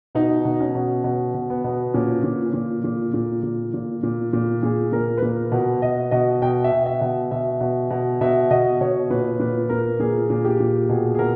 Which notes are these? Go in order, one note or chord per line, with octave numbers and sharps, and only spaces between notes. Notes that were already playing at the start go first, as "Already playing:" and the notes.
B2 D#4
B2
C#4
B2
B2
B2
B3
B2
A#2 C#4
A#2
A#2
A#2
A#2
A#2
A#2
A#2
A#2
A#2 G#4
A#2 A#4
B4
A#2 A#4
B2 B4
B2 D#5
B2 D#5
B2 G5
E5
B2
E5
B2
B2 E5
B2
B2
B2 E5
B2 D#5
B2 C#5
A#2 B4
A#2 B4
A#2 A#4
A#2 G#4
A#2
G4
A#2
B2 G#4
G#4
B2 A#4